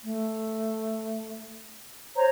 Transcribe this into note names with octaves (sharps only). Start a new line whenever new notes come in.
A3
C5 C#5 A#5